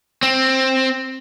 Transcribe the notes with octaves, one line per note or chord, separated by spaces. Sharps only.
C4